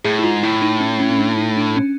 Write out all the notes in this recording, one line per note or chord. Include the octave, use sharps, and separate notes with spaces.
A2 G#4
E4
G#2 F4
A2 E4
D#4
C#4
C#4
C#4
D4
D#4
D4
C#4